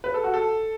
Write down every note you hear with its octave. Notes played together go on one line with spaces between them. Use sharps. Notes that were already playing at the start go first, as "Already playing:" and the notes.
B4
A4
F#4
A4